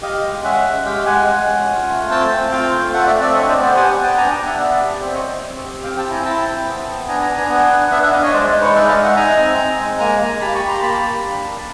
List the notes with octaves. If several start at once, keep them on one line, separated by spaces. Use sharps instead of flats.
G4 D#5 F5
G#3
C#4 E5 F#5
G#3
G4 F5 G5
G#3 F#5 G#5
G#3
C#4
F4
A3
C4 G5 A5
C4
F4 F5 G5
A3
A3 E5 F#5
D5 E5
C4
D5 E5
D4 C#5 D#5
C5 D5
B3
C5 D5
G4 F#5 G#5
F#5 G#5
B3
G5 A5
D4 G#5 A#5
G5 A5
D4
E5 F#5
B3 D5 E5
G4
C4 C5 D5
C#5 D#5
C4
C4
G4
C4 F5 G5
G5 A5
E4
G#5 A#5
E4 G5 A5
C4
B3
B3
D4 G#5 A#5
G#5 A#5
D4
G#5 A#5
B3 F#5 G#5
D4
D4 E5 F#5
E5 F#5
D4 D#5 F5
C#5 D#5
G#3 C5 D5
D#4
B4 C#5
G#3 D5 E5
D#5 F5
D#4
E5 F#5
D#4 G#5 A#5
C4
C4
G#3
A#3 G#5 A#5
A#3
G4 A5 B5
B5 C#6
G4
A#5 C6
A#3 A5 B5
G4
D4
A#3